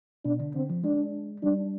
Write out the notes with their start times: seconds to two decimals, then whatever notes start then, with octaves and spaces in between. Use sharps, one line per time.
0.25 B2 D4
0.40 D3
0.55 D3 C4
0.70 F3
0.84 G#3 D4
1.43 G3 D4